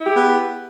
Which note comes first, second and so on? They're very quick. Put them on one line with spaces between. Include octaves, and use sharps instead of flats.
E4 G4 G#4 B3